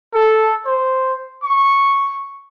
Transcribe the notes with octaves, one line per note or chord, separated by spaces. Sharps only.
A4
C5
C#6